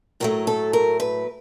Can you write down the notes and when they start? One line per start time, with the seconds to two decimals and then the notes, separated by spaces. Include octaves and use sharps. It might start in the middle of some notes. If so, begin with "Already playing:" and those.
0.20 A2 F#3 A3 A#4
0.47 A4
0.73 A#4
1.00 B4